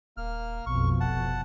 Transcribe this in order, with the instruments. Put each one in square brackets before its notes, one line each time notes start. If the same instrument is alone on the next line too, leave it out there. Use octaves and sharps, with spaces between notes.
[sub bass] D#1 [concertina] A#3 F6
[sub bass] A#1 [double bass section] F2 B2 [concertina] C#6
[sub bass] F1 [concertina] F#5 A5